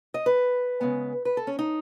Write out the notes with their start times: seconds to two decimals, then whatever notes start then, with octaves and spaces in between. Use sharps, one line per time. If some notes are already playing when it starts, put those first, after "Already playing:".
0.14 D#5
0.26 B4
0.81 C#3 G#3 B3
1.25 B4
1.37 A4
1.47 C#4
1.59 D#4